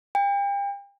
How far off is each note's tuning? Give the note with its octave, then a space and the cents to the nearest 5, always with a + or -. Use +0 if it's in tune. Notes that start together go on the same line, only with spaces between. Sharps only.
G5 +35